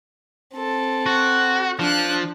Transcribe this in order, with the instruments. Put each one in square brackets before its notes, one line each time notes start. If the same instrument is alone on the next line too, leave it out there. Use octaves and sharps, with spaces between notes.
[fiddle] C4 A4
[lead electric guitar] F#4
[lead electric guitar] F3 [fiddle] D4 F#6